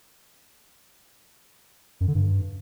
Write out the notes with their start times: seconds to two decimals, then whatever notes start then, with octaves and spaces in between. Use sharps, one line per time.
2.01 F#2
2.08 D3
2.15 G2